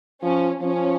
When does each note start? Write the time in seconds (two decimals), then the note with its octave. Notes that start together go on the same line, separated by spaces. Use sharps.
0.23 F3 C#4
0.62 F3 C#4